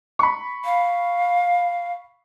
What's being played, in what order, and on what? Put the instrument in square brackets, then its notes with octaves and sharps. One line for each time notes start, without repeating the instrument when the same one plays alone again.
[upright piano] B5 C#6
[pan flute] F5